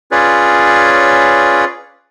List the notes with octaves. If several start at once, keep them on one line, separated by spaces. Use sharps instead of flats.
C#4 F4 G#4 B4 C#5 D5